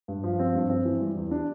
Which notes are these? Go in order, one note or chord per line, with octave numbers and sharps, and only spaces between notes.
G2
F3
C4
G2
C4
E3
G3
E2
D4